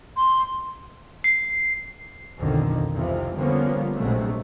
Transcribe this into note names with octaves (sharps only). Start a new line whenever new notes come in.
C6
C7
B1 F2 D3 D#3
C2 F2 C3 E3 F3
D3 F3 G3 A#3 B3 C#4
A#1 A2 C3 F#3 G#3 A3